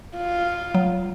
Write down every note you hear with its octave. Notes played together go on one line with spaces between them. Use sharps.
F4
F#3